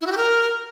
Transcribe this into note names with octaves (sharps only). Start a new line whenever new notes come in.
E4
F#4
G4
A#4